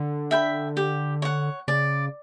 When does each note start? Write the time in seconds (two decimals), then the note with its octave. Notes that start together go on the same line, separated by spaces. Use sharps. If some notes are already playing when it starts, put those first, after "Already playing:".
Already playing: D3
0.31 E5 G5 B5
0.77 G4
1.22 C#5 F#5
1.68 C#3 D5